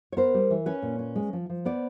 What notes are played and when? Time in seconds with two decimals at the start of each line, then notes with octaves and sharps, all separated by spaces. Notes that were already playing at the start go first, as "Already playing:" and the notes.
0.12 C#5
0.17 B3 A#4 C5
0.34 G3
0.50 E3
0.66 C#4 B4 C#5
0.82 A#2
0.99 C#4
1.15 G#3
1.33 F3
1.49 F3
1.65 B3 C5 D5